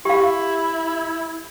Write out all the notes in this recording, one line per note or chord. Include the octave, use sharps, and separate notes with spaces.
E4 G4 F5